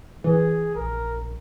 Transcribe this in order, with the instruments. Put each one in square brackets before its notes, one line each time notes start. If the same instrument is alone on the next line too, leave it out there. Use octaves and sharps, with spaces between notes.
[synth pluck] E3 [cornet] G#4
[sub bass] A#1 [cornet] A#4